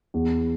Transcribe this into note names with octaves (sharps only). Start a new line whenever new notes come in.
E2